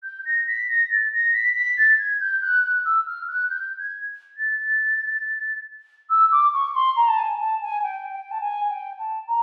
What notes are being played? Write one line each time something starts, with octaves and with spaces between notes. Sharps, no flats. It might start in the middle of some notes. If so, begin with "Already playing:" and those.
G6
A#6
B6
A#6
A6
A#6
B6
B6
A6
G#6
G6
F#6
F#6
E6
F6
F#6
G6
G#6
A6
E6
D6
C#6
C6
A#5
A5
G#5
A5
G#5
G5
G5
A5
G#5
G5
A5
A#5